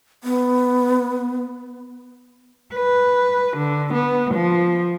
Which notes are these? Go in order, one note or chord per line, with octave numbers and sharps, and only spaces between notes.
B3
B4
D3
B3
F3